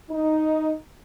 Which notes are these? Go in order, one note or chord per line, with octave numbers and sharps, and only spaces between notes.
D#4